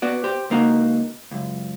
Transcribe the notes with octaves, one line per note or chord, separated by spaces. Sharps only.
B3 F#4 D5
G4 C5
C#2 A#3 D#4 F#4
C#2 F#2